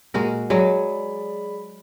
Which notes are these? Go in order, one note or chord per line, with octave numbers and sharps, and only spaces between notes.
A#2 G#3 A#3 F#4 A#4
F#3 G#3 G#4 D5 B5